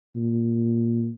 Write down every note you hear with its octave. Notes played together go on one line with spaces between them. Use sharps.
A#2